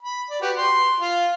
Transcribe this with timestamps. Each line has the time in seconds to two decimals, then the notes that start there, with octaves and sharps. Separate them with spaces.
0.02 B5
0.30 D5
0.41 F#4 G4 B4
0.57 C6
1.00 F4